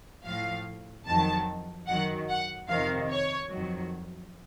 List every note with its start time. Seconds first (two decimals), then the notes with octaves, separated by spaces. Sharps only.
0.24 A2 F3 F5
1.06 F2 D#3 F#3 A5
1.87 F#2 D#3 F#3 F#5
2.29 F#5
2.69 F2 C3 D#3 F5
3.10 C#5
3.50 F2 D#3 F#3